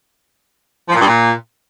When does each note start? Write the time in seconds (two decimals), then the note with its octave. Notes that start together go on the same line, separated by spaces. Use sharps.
0.89 F3
0.95 A#2
1.01 G2
1.07 A#2